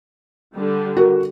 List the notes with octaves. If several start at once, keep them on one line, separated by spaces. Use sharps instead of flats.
D3 G3
F#4 A#4